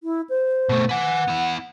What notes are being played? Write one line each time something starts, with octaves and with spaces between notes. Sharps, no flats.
E4
C5
B2 A3
B4 F#5 G#5
B3 E4